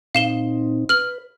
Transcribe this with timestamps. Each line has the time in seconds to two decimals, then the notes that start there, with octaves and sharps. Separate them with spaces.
0.15 A#2 C4 D#4 F5 E7 G7
0.89 B4 F6 F#7